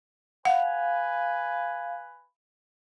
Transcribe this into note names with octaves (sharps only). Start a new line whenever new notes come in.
B4 F5 F#5 G#5